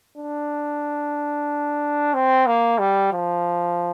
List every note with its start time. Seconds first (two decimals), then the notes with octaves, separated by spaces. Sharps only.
0.17 D4
2.14 C4
2.46 A#3
2.79 G3
3.12 F3